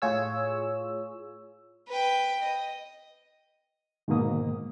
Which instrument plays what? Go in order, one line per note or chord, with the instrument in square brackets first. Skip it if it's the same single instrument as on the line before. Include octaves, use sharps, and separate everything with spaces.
[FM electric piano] A2 F4 G#4 C#5 E6
[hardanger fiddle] B4 G5
D#5
[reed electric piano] G#2 B2 D3 D#3 A#3 D#6